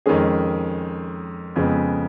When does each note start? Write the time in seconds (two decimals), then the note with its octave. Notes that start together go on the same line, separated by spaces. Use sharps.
0.06 F2 D#3 G#3 C#4 G#4
1.56 F2 C#3 G#3 B3